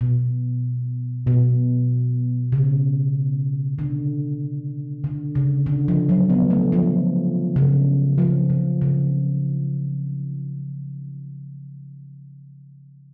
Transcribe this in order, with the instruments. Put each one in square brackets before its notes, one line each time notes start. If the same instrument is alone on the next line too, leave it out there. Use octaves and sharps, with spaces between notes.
[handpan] B2
B2
C#3
D3
D3
C#3
D3
F3
F#3
B3
A3
F3
C#3
F3
C#3
C#3